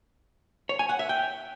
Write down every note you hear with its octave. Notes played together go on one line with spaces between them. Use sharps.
C#5
G#5
F#5
E5
G5